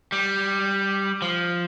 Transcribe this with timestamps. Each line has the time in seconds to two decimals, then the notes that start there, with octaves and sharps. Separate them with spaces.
0.12 G3
1.22 F3